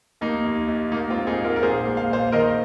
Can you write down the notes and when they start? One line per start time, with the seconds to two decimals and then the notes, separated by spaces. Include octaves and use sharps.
0.21 D#2 A#3 D#4
0.45 D#2
0.68 D#2
0.92 G#2 A#3 D#4
1.10 C4 F4
1.15 G#2
1.27 D#4 G#4
1.39 G#2
1.44 F4 A#4
1.56 A#4
1.63 A#1 G#4 C5
1.85 A#2
1.97 F5
2.10 A#2 C5 F5
2.32 D#3 A#4 D#5